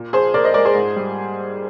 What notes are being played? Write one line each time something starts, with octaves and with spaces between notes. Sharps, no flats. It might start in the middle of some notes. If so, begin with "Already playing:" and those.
Already playing: A#2
F3 G#4 C5
A#2 A#4 D5
C5 D#5
G#3 A#4 D5
G#4 C5
G#2
G3